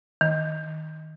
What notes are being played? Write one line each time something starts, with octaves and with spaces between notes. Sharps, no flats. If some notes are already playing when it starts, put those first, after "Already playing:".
D#3